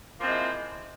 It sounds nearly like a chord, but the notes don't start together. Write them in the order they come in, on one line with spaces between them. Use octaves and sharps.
F3 A#3 C4 G#3 E4